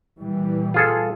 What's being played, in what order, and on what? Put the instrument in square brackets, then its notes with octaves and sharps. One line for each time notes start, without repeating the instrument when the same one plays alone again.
[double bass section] A#2 E3 G3
[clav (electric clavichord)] F4 G#4 A4